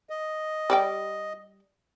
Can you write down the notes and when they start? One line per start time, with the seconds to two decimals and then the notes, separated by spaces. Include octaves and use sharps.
0.10 D#5
0.70 G3 D5 G5